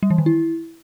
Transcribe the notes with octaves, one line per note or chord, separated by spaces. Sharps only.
G3
E3
D#3
E4